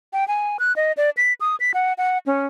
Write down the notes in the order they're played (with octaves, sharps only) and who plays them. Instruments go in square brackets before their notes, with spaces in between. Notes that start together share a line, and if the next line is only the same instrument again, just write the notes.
[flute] G5
G#5
F#6
D#5
D5
B6
D#6
B6
F#5
F#5
C#4